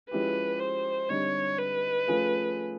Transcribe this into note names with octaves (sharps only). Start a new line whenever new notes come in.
F3 G#3 C#4 E4 G4 B4
C5
D3 G3 C4 D#4 C#5
B4
F3 A3 C#4 F4 G#4